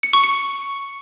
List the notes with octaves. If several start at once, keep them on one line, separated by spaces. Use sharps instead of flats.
C#7
C#6
C#7